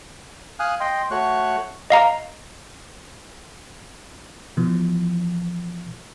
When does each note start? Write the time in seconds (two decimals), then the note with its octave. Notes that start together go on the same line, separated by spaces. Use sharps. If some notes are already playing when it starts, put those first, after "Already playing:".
0.60 F5 G#5 D#6 F6 F#6
0.80 D#5 G5 C6
1.11 A3 F#4 C#5 C#6 F#6
1.90 D#5 F5 A#5
4.57 B2 E3 F3